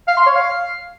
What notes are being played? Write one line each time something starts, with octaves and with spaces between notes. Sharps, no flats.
F5
C6
C#5
F5